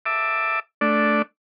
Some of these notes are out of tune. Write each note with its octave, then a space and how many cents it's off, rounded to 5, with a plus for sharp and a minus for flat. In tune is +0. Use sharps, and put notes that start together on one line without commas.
E5 +0 A5 +20 D6 +10
A3 +0 D4 +0 D5 +0